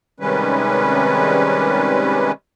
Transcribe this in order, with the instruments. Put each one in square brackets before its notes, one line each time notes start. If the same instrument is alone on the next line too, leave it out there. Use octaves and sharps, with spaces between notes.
[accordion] C3 D#3 G3 G#3 C#4 B4